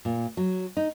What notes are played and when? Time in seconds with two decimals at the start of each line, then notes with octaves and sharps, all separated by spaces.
0.05 A#2
0.37 F#3
0.77 D#4